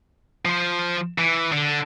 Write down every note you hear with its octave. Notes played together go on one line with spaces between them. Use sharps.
F3 C5
E3
D3